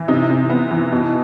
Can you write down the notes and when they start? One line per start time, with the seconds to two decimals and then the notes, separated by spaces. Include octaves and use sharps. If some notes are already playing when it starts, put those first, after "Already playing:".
Already playing: E3
0.08 C3 D#4
0.30 C3
0.50 B3
0.71 E3
0.92 B2